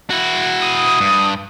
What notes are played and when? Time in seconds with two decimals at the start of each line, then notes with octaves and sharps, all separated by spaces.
0.10 E4 F#4
0.61 D#6
1.00 G2